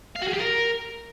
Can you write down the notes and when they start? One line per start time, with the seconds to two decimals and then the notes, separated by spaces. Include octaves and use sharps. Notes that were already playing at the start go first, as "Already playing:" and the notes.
0.16 F5
0.22 F#4
0.27 G#4
0.33 G4
0.39 A#4